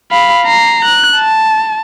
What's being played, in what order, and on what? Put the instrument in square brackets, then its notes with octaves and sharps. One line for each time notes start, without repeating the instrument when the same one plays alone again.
[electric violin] F5 B5
A#5 C7
F#6
A5